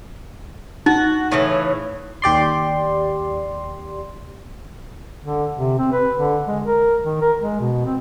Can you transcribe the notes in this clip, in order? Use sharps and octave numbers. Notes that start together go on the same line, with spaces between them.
D#4 F#4
A2 C#3 E3
D#2 G4 D5 C6
D3
C3
C4
B4
D3
G#3
A#4
D#3
A#4
G#3
B2
C4